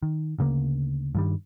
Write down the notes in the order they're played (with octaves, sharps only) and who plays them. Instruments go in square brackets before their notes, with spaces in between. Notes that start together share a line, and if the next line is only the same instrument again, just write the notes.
[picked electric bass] D#3
D2 C#3 A3 A#3
G2 D#3 G3